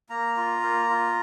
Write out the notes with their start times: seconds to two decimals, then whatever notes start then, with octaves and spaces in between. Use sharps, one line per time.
0.09 A#3 A#5
0.37 F4
0.63 A#3
0.89 F4